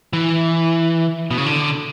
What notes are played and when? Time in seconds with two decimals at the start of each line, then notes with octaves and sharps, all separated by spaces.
0.13 E3
1.31 B2
1.38 C#3
1.46 D3